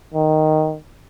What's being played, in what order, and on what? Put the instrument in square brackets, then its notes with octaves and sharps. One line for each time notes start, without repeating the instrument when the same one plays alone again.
[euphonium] D#3